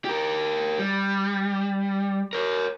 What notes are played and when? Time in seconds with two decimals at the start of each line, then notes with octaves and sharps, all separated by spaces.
0.05 G4 A#4
0.79 G3
2.33 A#4 C#5